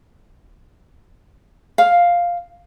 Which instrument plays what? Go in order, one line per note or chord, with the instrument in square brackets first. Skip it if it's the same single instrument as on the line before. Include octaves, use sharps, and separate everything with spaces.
[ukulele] F5